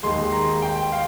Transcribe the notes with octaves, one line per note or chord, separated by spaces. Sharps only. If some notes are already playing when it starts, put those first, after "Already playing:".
D#2 D#3 G#3 C6
A#5
G5
F5